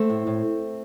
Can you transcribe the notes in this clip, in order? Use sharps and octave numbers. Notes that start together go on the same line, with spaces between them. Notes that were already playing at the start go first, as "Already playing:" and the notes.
Already playing: A3 C4
A2
A2